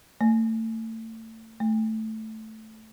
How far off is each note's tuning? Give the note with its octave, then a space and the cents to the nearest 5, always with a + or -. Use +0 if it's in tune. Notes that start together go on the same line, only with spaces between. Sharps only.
A3 +30
A3 +0